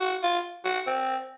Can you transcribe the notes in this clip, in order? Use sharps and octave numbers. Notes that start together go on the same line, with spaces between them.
F#4
F4
F#4
C4